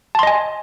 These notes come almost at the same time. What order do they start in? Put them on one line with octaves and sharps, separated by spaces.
A5 C6 D#5 G#5